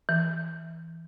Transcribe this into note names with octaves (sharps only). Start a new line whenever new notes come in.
E3